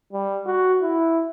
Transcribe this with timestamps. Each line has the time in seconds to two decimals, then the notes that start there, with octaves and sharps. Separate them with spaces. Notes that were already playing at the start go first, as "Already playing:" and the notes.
0.13 G3
0.46 F#4
0.82 E4